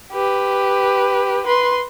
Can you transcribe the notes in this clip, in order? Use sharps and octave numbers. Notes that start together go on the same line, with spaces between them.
G4 B4
B4 C6